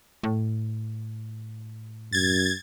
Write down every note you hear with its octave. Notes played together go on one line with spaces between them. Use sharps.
A2
F#2 G#6 A6